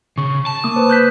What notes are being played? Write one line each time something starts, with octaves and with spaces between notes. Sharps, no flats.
C#3 C#6
A5
A#3 D6 D#6
B4 C5
F#6 G6 B6